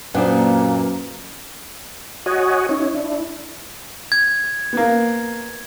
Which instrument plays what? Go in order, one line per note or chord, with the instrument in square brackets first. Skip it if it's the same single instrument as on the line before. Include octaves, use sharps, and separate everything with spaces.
[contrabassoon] F#2 [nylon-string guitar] A#2 [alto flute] A#3 [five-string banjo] B3 D4 C5
[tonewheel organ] F#4 C#5 D#5 F#5 G#5
C#4 D#4 E4 C#5
D4 E4
[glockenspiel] G#6
[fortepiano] A#3 B3